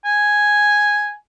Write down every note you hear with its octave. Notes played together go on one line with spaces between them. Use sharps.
G#5